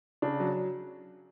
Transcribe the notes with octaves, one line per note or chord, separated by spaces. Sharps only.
C#3 D4
F#3